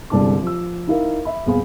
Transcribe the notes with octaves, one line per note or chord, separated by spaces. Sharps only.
G1 C2 G#3 D4 A5 D6
F3 E6
D#4 E4 A#4 F5
E5 B5
D#1 B3 C4 G#4 F5 B5